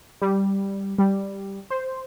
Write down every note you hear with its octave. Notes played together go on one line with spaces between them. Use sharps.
G3
G3
C5